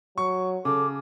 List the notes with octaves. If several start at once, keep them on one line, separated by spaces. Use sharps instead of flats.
F#3 C#6
C#3 A4 D6